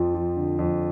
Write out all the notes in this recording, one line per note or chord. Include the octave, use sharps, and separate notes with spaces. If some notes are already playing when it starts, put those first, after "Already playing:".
Already playing: F2 F3
F3
D3
F2